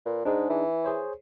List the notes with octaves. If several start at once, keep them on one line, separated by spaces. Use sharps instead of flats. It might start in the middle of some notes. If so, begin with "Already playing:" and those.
A#2 B4
G#2 D4 D#4 G#4
E3
G#4 C5 C#5